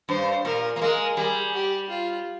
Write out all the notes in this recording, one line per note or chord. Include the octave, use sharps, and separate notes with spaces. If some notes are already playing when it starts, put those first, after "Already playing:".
G2 C5
A#2 A#4
A#3
G#3 A#4
G3 G#4
G4
F4